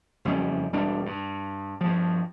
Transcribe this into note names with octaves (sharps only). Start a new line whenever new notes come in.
F#1 F2 G3 C#4
E1 G3 D4
G2
G2 F3